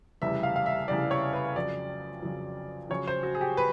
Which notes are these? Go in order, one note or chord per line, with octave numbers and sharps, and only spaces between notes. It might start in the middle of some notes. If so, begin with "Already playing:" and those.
F1 E2 C#3 E3 G3 E5
F5
F5
E5
F1 E2 C#3 E3 G3 D5
C#5
B4
F2 C#3 F#3 D5
F2 C#3 F#3
F2 C#3 F#3 C#5
C5
F#4
G#4
G4
B4